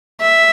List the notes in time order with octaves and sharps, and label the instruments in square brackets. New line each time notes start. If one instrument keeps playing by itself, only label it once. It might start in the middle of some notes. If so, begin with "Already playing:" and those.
[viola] E5